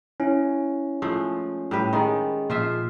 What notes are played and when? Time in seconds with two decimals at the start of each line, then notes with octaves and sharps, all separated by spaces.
0.20 C#4 E4
1.02 F3 G#3 A3
1.71 A2 G3 B4
1.93 D#3 G#3 G#4 D#5
2.50 A#2 F3 F4 E5